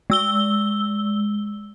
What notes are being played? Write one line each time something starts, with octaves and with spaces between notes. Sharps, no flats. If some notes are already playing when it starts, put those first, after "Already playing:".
G#3 E6 G7